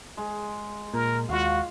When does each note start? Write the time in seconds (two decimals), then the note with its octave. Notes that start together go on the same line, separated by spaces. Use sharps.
0.17 G#3
0.94 A#2 A#4
1.29 D#2 G#3 F4 F#4 F5